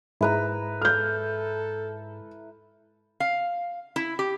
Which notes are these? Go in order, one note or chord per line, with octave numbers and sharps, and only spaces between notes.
G#2 G#3 E4 B4 A#5
A4 F6 G6
F5
E4
G4